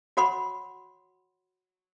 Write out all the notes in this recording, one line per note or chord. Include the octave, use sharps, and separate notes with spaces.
F#4 C#5 F#5 B5 C6